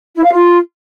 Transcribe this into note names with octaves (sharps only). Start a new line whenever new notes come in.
E4
F5
F4